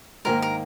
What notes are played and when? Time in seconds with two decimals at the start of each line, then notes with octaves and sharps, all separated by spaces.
0.25 G#2 D#3 A#3 A#4
0.42 A#4